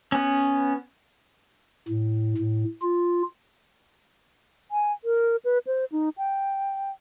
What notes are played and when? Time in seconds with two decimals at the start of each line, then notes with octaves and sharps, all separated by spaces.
0.12 B3 C#4
1.88 A2
2.38 A2
2.82 F4
4.71 G#5
5.04 A#4
5.45 B4
5.67 C5
5.92 D#4
6.18 G5